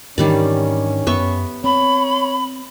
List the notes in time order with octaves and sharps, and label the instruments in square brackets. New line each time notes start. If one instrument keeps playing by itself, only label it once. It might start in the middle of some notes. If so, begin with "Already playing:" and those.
[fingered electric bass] G#2 E3 D4 [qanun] D#3 G3 D5 [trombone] C#4
[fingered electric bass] F#2 [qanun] B3 E5 C#6
[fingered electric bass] C4 [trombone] C#5 [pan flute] B5